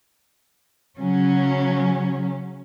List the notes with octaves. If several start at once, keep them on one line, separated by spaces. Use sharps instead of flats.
C#3 F#3 C#4